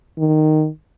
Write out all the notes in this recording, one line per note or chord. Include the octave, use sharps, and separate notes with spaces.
D#3